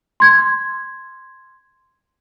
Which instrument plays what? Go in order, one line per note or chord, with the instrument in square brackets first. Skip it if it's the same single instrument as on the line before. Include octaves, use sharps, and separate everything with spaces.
[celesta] C6 G#6